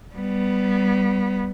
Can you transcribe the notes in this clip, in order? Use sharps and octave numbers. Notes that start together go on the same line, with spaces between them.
G3 B3